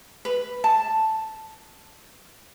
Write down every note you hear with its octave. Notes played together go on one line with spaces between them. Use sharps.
B4
A5